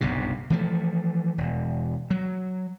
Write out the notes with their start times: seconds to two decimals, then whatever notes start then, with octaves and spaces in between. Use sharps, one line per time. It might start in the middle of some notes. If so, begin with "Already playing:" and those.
0.01 F#1 B1 G2 C3
0.50 E3 F3 A3
1.38 E1
2.10 F#3